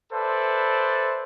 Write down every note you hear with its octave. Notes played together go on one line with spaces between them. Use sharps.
A4 B4 C5 D5 E5 A5